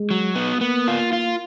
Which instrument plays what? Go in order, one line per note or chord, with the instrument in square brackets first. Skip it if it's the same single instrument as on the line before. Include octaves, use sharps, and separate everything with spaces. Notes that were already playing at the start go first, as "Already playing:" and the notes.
Already playing: [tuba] G#3
[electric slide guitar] F#3
B3
[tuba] A#3 [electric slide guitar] B3
[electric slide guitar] F4
F4